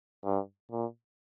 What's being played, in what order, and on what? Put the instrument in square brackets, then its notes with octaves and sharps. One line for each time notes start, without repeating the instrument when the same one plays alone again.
[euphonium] G2
A#2